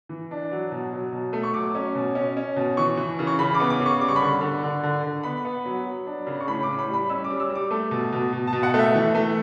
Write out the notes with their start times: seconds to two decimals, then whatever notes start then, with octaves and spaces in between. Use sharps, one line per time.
0.09 E3
0.31 D4
0.51 F#3
0.72 B2
0.93 F#3
1.12 B2
1.33 A3
1.43 C#6
1.54 F#3 D6
1.75 C#4
1.95 B2
2.15 C#4
2.37 C#4
2.56 B2
2.77 E3 C#6
2.97 E3
3.19 C#3
3.27 C#6
3.39 C#3 B5
3.55 D6
3.60 B3
3.70 D6
3.80 C#3
3.86 C#6
4.00 G3 D6
4.08 C#6
4.16 B5
4.21 D3 C#6
4.41 D3
4.63 D3
4.83 D3
5.03 D3
5.23 B3 B5
5.45 B3
5.65 F#3
5.86 F#3
6.07 D4
6.27 C#3
6.40 C#6
6.48 A2 B5
6.63 D6
6.68 A2
6.79 B5
6.89 G3 B5
7.09 C#4 E6
7.24 D6
7.30 G3
7.40 E6
7.50 G3
7.55 D6
7.71 A3
7.91 B2
8.12 B2
8.33 B2
8.47 A5
8.53 B2
8.63 F#5
8.74 A3 F#5
8.79 E5
8.95 E3
9.15 A3